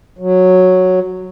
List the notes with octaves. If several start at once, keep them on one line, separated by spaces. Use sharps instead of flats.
F#3